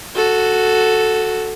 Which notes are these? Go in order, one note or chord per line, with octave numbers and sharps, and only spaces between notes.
F#4 A4